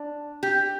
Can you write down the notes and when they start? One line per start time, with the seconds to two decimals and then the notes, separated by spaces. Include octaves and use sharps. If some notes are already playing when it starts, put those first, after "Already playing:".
Already playing: D4
0.43 G4